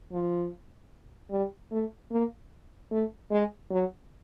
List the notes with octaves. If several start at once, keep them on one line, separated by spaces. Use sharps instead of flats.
F3
G3
A3
A#3
A3
G#3
F#3